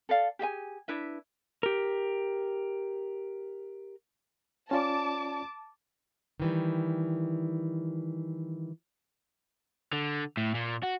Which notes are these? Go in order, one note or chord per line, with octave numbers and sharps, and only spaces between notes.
A4 D5 F5
G4 G#4 E5 G#5
D4 E4 B4 E5
G4 A#4
C#4 F4 D5 A5 D6
D#3 E3 G3
D3
A2
A#2
F#4